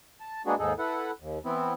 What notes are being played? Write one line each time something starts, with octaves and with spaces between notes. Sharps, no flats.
A5
G#3 A#3 B3 D4 F#4 G#4
D#2 G#2 D#4 G#4 A4
E4 A4 B4 F#5
D#2
E3 B3 C4 E4